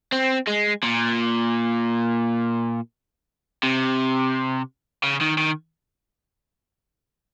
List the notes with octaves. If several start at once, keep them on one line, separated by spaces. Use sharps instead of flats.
C4
G#3
A#2
C3
C#3
D#3
D#3